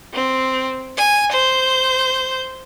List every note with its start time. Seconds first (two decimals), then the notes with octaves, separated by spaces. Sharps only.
0.13 C4
0.98 G#5
1.32 C5 G6